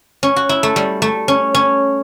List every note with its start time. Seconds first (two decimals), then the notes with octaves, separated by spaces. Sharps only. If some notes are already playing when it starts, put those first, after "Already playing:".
0.23 C#4
0.36 F#4
0.49 E4
0.63 A3
0.76 G3
1.02 A3
1.28 C#4
1.55 C#4